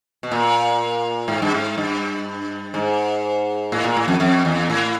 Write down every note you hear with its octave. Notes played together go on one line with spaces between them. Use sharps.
B2
A#2
G#2
G2
G#2
G2
G#2
A2
A#2
A2
F2
F2
E2
A2